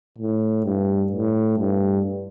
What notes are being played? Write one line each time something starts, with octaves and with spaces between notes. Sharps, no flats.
A2
G2
A2
G2